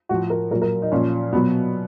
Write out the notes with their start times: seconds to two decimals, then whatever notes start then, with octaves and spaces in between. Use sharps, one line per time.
0.09 A2 F3 F#4
0.30 A#4
0.51 A#2 F#3 A#4
0.62 A#4
0.82 D#4
0.92 A#2 F3 C#4
1.32 B2 F#3 B3